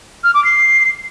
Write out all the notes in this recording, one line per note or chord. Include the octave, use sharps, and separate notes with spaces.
F6
D6
C7